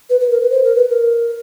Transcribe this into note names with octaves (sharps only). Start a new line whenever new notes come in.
B4
B4
A#4
B4
C5
A#4
B4
A#4